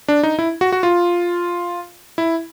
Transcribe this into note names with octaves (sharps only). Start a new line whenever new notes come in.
D4
D#4
E4
F#4
F#4
F4
E4